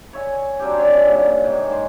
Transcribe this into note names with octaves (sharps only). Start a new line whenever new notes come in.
C#5 E5 G#5
F#3 C4 D4 G4
D3 C#4 C#5
G2 A#2 D#3
G#2 D#3
G#2 C6